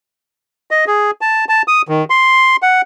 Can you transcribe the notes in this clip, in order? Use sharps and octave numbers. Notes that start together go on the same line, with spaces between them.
D#5
G#4
A5
A5
D#6
D#3
C6
F#5